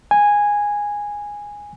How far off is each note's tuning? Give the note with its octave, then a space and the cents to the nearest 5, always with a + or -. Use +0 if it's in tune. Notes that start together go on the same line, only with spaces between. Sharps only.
G#5 -10